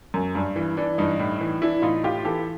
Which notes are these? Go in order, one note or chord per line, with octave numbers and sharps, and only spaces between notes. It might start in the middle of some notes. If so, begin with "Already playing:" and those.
F#2
G2
E3
E3 D4
G2 D#4
A2
E3
E3 D4 E4
A2 D#4 F4
A2 F4 G4
E3 G4 A4